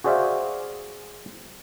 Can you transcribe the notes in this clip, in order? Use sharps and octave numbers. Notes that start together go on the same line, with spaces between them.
F#4 G#4 C5 D5 E5 F5